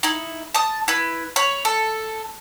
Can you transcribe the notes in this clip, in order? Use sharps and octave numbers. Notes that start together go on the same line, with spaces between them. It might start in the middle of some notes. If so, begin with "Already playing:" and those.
D#4 E4
A5 D#6
E4 B4
C#5 B5
A4